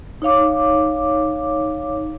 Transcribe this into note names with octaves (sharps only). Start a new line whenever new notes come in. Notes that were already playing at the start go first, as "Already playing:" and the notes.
D#4 C#5 F5 D6